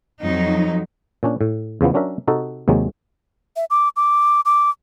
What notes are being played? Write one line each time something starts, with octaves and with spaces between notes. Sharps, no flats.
F2 F#3 D#4
A#2 C#4 D4
A2
E2 C#3 F3 B3
F#3 C#4 D4 A#4 E5
C3 D#4 F#4 A4
D#2 C3 F#3 G#3
E5
D6
D6
D6